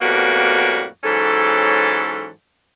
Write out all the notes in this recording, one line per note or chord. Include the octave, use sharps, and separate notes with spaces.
F2 A2 G3 A#3 B3 F#4
G#2 E3 F#3 C#4 A4